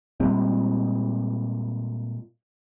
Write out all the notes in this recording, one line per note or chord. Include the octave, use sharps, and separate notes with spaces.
A#2 G3 G#3 C4